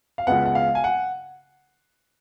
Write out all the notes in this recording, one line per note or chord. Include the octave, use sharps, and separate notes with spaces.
F5
C#2 C#3 G#3 B3 F#5
F#5
F5
G#5
F#5